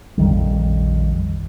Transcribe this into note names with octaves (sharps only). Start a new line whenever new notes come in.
A#1 F2 D#3 G3